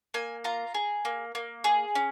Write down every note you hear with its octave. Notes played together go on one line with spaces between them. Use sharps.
A#3 G#5
F4 A#5
G#4
A#3
A#3
G#4
C#4